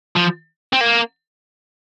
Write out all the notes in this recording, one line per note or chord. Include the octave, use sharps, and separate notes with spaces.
F3
C4
A#3